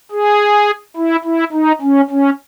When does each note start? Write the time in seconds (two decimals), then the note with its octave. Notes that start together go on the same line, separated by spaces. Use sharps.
0.12 G#4
0.97 E4
1.25 E4
1.53 D#4
1.81 C#4
2.10 C#4